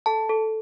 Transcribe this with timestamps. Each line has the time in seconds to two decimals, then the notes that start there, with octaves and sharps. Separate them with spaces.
0.06 A4 A5
0.29 A4